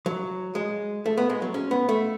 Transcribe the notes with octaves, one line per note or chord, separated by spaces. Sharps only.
F#3
G#3
A3
B3
G#3
F#3
C#4
B3
A3